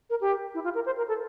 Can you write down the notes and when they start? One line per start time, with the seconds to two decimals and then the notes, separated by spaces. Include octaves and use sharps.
0.10 A#4
0.21 G4
0.54 E4
0.64 F4
0.75 A#4
0.86 C5
0.97 A#4
1.08 A4